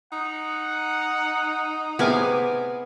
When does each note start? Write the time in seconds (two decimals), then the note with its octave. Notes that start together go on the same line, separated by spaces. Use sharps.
0.12 D#4 F#5
1.99 C3 B3 G#4 G#5 D6 F6